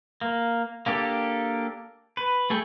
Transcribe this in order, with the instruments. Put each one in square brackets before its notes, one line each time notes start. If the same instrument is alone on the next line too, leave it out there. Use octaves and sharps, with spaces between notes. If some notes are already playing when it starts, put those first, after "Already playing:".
[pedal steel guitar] A#3
A#3 D4 G4 A4
B4
A3 G#4 A4 G5